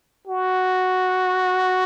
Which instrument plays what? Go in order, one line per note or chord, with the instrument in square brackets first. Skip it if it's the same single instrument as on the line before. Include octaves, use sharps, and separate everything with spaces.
[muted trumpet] F#4